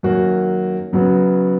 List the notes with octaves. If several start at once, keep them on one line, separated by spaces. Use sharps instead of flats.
F#2 D#3 A#3 C#4 F#4
F#2 C#3 F#3 B3 F#4